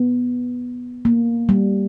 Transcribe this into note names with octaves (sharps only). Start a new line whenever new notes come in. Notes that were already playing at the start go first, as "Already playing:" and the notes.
Already playing: B3
A#3
G3